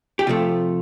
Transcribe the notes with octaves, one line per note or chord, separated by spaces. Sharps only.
G4
C3 F3 A3 F4